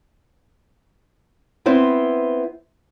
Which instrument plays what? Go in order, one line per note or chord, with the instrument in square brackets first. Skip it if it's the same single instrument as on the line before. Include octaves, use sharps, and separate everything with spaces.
[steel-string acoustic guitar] B3 C4 E4 C5